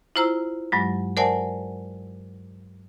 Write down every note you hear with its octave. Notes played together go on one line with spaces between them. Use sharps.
E4 F4 C5 A#5 E6
G2 F#3 G#3
A#4 C5 D5 F#5 G#5 A5